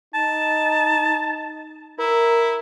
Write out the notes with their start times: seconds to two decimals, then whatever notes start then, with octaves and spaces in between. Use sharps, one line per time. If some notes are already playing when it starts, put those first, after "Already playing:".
0.14 D#4 A5
1.99 E4 A#4